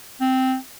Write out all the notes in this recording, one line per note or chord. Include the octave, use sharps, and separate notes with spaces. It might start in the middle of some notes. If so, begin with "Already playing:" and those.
C4